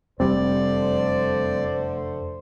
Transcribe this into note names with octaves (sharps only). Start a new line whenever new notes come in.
F1 D3 G3 A3 C4 C5 D5